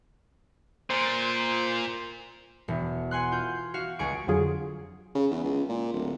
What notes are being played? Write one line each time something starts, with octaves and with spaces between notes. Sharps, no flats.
A#2 C5
E1
F#5 G#5 C6 F#6
F4 G6
F#4 F5
C#2 G#4 C#6 D7
F2 D3 F#3 F4 G#4
C#3
E2
C#2
A#2
D1